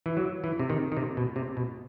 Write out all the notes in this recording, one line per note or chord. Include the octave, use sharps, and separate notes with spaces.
E3
F#3
E3
C3
D#3
D#3
C3
B2
C3
B2